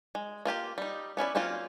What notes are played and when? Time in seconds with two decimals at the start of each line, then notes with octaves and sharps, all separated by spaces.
0.15 G#3
0.45 A#3 F4 G4 A#4
0.78 G3 D#4
1.17 B3 C#4 E4 D5
1.35 F#3 A#3 C4 C#4 F4